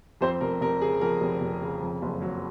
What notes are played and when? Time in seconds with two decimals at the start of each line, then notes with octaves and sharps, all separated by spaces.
0.21 F2 C4 C5
0.41 F1 A#4
0.61 F1 A#4
0.81 C#3 G#4
1.01 F2 A#4
1.21 F1
1.41 F1
1.62 C#3
1.82 F2
2.02 F#1
2.22 F#3